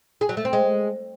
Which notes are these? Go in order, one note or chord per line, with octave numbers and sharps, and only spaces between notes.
G#4
F#3
A3
C4
G#3